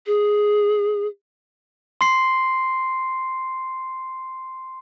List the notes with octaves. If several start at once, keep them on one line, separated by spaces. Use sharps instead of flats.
G#4
C6 C7